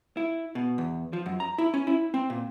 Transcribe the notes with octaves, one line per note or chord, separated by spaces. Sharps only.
E4
B2
E2
F3
F#2
A#5
E4
C#4
E4
C4
A#2